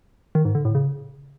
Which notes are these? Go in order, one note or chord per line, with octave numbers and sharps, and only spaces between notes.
D#3
G#2
D3
A2
C#3